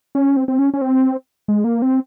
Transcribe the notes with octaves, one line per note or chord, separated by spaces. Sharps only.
C#4
C4
C4
C#4
C#4
C4
G#3
A#3
C4